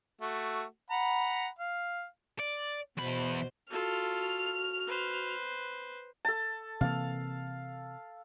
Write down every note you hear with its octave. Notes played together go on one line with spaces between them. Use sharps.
A3 F#4
F#5 A#5 B5
F5
D5
E2 B2 C5 B5
F4 F#4 A4 F6
B4 C5
A4 A5
C3 E3 A#3 F5